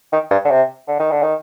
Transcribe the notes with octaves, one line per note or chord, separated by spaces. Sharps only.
D#3
G2
D3
C3
D3
D#3
D3
D#3